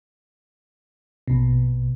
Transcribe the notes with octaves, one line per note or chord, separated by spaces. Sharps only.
A#1 B2